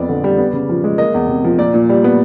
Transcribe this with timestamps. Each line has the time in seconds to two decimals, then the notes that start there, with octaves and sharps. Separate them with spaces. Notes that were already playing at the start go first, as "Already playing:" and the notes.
Already playing: F2 B3 D5
0.09 D3
0.24 G3
0.38 B3
0.53 C#3
0.69 F3
0.84 G#3
0.98 A#3 D#5
1.14 E2
1.28 C3
1.44 F3
1.58 A#2 D5
1.74 A#2
1.89 G3
2.04 B3